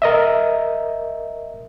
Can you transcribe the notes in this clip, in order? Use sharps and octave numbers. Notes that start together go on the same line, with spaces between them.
A#4 D#5 E5